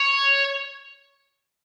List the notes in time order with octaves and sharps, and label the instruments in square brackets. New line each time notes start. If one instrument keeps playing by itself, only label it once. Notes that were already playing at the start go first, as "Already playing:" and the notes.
Already playing: [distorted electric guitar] C#5